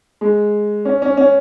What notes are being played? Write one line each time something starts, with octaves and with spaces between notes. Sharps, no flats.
G#3
C#4
C#4
C#4